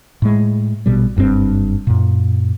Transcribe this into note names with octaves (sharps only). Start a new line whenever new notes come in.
A2 G#3
A#1 B2 G3
F#1 G2 C3 C4
F#2 A#2